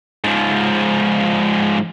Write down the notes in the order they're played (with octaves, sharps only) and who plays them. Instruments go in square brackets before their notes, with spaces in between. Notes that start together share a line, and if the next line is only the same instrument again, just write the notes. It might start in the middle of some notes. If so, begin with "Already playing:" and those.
[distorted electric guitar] G#2 F3